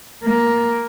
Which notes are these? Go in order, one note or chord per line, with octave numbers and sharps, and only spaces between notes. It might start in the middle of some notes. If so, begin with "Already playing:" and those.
A#3